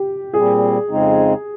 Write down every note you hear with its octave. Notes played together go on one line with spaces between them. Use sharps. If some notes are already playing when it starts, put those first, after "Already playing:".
Already playing: G4
A#2 G3 C4 G#4
F2 C#3 G#3 C4 D#4